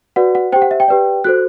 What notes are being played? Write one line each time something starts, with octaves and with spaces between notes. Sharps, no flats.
F#4 B4 D5 F#5
F#5
G4 C5 G5
F#5
E5
G5
G4 B4 D5
F#4 A4 C5 F#6